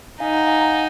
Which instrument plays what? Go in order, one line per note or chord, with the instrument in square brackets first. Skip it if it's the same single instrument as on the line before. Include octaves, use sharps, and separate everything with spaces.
[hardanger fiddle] D#4 [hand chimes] F5 G#5
[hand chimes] F#5 A#5
F5 G#5
F#5 A#5